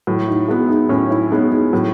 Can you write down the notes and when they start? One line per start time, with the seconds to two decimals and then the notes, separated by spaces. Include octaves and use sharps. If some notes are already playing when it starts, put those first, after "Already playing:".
0.07 A2 F#3
0.28 D#4
0.48 G#3 B3 E4
0.69 D#4
0.89 A2 C#4
1.11 E4
1.31 G#3 B3 D#4
1.52 D#4
1.73 A2 F#3